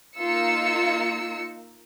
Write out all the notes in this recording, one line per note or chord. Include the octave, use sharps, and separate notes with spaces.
A#3 D#4 F4 E6 C#7